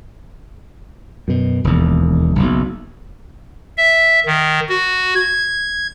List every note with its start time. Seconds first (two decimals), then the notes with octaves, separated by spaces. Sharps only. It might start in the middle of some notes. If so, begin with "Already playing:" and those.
1.28 F#2 B2
1.64 E1 D#2
2.35 F#1 B1
3.77 E5
4.26 D#3
4.69 F#4
5.15 G#6